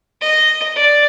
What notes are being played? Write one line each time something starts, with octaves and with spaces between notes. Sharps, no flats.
D#5
D5